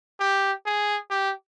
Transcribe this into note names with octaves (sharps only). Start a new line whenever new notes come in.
G4
G#4
G4